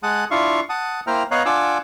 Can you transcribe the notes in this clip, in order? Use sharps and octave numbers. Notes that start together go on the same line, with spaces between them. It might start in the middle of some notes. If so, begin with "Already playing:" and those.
G#3 F#5 A5 D#6 F#6
D4 E4 F4 F5 C#6
F#5 A5 D#6
A#3 E4 C5 G5 A#5 F6
B3 C#5 D#5 F5 A#5 F#6
D4 F4 F#5 G#5 D6 E6